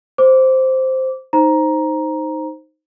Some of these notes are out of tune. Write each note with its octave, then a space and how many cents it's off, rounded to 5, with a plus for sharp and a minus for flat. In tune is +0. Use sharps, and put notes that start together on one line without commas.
C5 +0 D6 -15
D#4 +0 C5 +5 A#5 +10